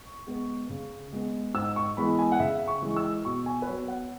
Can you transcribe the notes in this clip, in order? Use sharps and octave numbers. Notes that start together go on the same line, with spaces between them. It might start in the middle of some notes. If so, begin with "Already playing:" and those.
Already playing: C#6
G#3 B3
C#3
G#3 B3
G#2 E6
C#6
E3 G#3 B3 B5
G#5
F#5
C#3 E5
C#6
E3 G#3
E6
B2 C#6
G#5
B4
F#3 B3 C#5
F#5